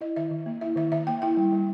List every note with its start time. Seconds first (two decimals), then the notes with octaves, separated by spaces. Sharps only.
0.01 E4 D#5
0.16 D#3 E5
0.31 D#3
0.46 A#3
0.61 E4 E5
0.76 D#3 E5
0.92 D#3 E5
1.07 A#3 G5
1.22 E4 G5
1.37 G3
1.52 G3